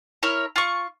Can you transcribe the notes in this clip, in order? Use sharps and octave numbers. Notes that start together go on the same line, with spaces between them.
E4 A#4 C#5 F6
F4 C#6